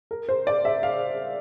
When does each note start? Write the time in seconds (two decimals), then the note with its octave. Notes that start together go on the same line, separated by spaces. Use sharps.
0.11 A#4
0.29 C5
0.47 D5
0.65 E5
0.83 F5